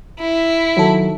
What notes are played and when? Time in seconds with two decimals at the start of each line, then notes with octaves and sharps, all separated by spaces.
0.19 E4
0.77 D#3 F#3 A4